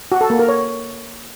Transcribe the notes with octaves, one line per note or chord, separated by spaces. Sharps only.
F#4
A4
A#3
A#4
C#5